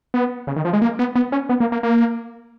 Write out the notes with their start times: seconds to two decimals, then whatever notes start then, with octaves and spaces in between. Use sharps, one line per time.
0.14 B3
0.47 C#3
0.56 D#3
0.65 F3
0.73 G#3
0.82 A#3
0.99 B3
1.15 B3
1.32 C#4
1.49 B3
1.60 A#3
1.72 A#3
1.83 A#3